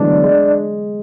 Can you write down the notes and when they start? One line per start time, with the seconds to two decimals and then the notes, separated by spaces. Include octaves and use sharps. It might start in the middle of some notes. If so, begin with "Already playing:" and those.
Already playing: D3 E3 F#3 G#3 A3 B3 D4
0.24 G#3